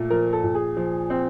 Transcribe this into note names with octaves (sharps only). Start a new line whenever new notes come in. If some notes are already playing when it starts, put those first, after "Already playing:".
Already playing: A#2 A3
F3 A#4
A4
A#2
G#4
F3
C4